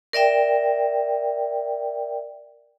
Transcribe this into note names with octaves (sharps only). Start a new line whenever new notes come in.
A#4 D5 E5 G5